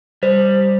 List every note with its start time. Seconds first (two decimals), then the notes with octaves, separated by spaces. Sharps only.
0.23 G3 C5